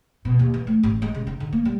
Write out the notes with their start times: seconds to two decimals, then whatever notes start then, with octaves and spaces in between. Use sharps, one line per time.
0.25 B2
0.39 D#2
0.54 E3
0.67 A3
0.83 A1
1.02 G#3
1.14 C#3
1.27 D#4
1.40 D3
1.53 A#3
1.65 G3